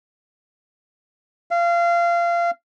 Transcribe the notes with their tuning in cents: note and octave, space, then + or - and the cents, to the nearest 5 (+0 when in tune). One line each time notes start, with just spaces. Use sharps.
F5 -25